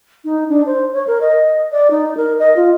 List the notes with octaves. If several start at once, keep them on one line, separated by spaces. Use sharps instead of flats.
D#4
D4
C5
C#5
A#4
D#5
D5
D#4
A#4
D#5
F4